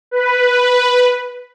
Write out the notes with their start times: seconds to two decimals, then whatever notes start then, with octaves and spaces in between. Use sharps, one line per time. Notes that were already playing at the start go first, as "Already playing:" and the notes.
0.11 B4